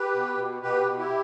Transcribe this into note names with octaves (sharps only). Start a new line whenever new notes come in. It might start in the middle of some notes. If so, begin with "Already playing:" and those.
Already playing: G4 B4
B2
B2
B2 G4 B4
B2
E4 G4